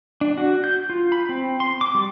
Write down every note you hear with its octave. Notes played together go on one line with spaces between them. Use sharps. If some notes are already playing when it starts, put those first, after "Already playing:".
D4
F#4
G6
F4
B5
C4
C6
D6
G3